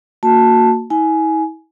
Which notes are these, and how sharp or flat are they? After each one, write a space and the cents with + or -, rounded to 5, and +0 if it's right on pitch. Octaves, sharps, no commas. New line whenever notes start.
A#3 -15 F#4 -20 A5 +0
E4 -45 G#5 +15